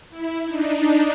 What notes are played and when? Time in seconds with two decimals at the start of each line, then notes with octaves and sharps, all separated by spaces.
0.10 E4
0.44 D4 D#4